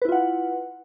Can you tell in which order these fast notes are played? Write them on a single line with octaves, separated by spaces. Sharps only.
B4 E4 F4 F#5